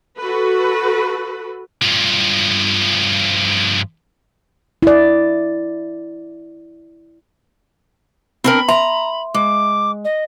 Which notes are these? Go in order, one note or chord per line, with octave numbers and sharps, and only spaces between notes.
F#4 A4 B4
G2 F3
E4 D5
C4 D4 A#4 B5
E5 A#5 C6
G#3 D6
D#5